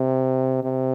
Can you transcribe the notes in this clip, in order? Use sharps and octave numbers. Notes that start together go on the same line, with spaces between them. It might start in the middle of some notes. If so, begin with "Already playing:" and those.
Already playing: C3
C3